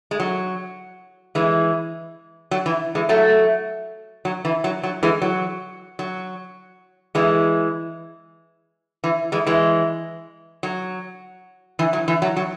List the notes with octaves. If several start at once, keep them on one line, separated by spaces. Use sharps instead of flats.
G#3
F#3
E3 G#3
F#3
E3
E3 G#3
F#3 A3
F#3
E3
F#3
F#3
E3 G#3
F#3
F#3
E3 G#3
E3
E3 G#3
E3 G#3
F#3
E3
F#3
E3
F#3
F#3